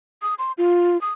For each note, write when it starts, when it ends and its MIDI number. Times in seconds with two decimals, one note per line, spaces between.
0.22 0.34 87
0.39 0.52 84
0.58 1.00 65
1.01 1.12 87